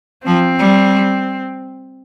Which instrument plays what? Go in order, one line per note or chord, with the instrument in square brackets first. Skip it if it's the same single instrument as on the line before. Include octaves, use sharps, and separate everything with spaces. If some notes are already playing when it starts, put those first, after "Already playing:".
[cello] F3 [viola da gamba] C4
[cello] G3